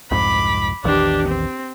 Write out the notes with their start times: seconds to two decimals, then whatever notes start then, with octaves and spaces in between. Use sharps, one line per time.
0.11 C2 F2 G#2 B5 D6
0.84 A#1 E2 D#3 D4 G4
1.27 C4